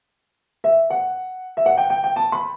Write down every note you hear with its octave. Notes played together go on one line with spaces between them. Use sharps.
E5
F#5
E5
F#5
G5
G5
G5
A5
B5